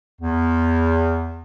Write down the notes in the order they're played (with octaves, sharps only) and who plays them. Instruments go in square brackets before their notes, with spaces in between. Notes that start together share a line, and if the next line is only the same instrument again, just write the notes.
[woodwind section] E2